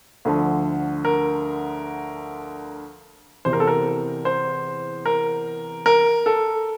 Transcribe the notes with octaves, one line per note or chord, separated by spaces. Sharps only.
D2 D3 F3
A#4
E2 C3 E3 C5
A#4
A4
A#4
C5
A#4
A#4
A4